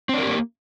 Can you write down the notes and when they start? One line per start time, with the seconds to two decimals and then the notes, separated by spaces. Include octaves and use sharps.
0.09 C4
0.14 D4
0.18 A#4
0.23 G4
0.27 A#3